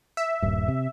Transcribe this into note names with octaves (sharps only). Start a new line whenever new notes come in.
E5
D#1 G2
C3